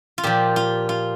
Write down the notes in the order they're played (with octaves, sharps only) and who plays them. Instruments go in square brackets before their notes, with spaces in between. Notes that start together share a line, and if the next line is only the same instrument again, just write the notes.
[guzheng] F4
A#2 F3 G4
F4
F4